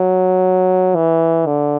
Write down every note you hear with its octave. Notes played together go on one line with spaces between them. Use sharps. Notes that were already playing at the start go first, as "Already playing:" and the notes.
Already playing: F#3
E3
D3